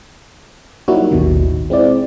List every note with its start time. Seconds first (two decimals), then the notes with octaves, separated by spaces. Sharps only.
0.88 F#3 G3 A#3 D#4 E4 F#4
1.11 A1 D#2 B2 D#3
1.70 G#3 C4 E4 D5